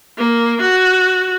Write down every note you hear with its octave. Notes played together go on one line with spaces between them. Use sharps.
A#3
F#4